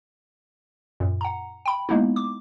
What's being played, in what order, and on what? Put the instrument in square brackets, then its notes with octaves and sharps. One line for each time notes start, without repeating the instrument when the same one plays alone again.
[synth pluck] F#2 A#2
F#5 A#5
G5 B5
G#3 A#3 B3 D#4 E4
D6